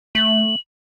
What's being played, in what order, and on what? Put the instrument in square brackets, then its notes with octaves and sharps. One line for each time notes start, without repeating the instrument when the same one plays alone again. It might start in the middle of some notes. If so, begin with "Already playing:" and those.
[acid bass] A3 [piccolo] F#7